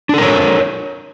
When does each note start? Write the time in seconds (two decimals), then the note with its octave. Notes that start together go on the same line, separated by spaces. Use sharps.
0.09 D4
0.14 A4
0.18 A#4
0.23 C#5